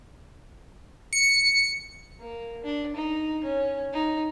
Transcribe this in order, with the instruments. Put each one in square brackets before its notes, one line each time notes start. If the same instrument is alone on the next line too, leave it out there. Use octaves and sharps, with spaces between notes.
[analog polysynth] C#7
[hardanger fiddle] A#3
D4
D#4
C#4
D#4